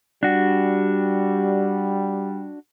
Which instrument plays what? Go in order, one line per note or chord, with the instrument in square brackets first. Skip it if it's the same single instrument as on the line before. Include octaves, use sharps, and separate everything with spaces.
[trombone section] G3 [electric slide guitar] D4 F#4